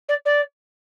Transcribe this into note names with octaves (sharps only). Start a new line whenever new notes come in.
D5
D5